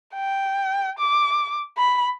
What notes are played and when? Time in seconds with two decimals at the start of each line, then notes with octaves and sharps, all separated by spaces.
0.14 G5
0.99 D6
1.77 B5